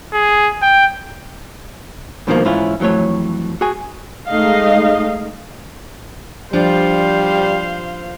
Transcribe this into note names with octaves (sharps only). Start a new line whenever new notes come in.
G#4
G5
G2 B2 D#3 F3 G#3 A#3
G#2 E3 C#4 E4 F4
F2 E3 F#3 A3 C#5
F#4 G#4 G#5
G#3 A3 D#4 D#5 F5
F3 G3 D4 C5 F5